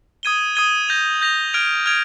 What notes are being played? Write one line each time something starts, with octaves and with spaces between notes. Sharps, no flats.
D#6 G#6 D#7 G7
D#6 G#6 D#7 G7
G6 A#6 F7
G6 A#6 F7
F6 G#6 D7 F7
F6 G#6 D7 F7